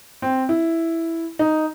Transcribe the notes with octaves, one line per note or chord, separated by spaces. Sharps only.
C4
E4
D#4